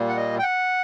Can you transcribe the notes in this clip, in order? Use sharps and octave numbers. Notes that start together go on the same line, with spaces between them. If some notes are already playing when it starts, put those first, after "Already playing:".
Already playing: A#2 G3 A#3
F#5
D#5
G5
F#5